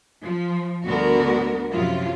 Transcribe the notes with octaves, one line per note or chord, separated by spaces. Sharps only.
F3
D2 G2 D3 B3 F#4 A#4
F#2 C3 F3 F#3 E4 F4